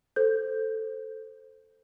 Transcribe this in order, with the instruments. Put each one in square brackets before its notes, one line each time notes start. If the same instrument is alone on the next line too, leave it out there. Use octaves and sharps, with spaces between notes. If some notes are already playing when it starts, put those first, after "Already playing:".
[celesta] A4 C5 G6